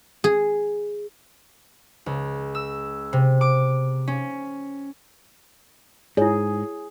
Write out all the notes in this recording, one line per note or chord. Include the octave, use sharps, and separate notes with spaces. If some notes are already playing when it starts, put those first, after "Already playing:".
G#4
C#2
E6
C3
D6
C#4
G#2 E4 G#4 C#5